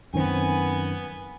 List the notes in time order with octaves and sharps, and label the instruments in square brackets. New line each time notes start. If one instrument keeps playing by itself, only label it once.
[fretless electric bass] F#2 D#3 C4 [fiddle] B3 G#5